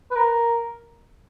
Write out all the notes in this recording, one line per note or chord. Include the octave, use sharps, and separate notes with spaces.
B4
A#4